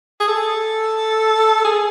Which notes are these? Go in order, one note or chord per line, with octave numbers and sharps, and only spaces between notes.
G#4
A4
G#4